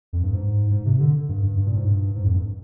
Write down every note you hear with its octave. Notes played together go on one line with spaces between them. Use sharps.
F2
G2
G#2
G#2
C3
D3
G2
G2
G2
A#2
G#2
G2
G#2
F2
G2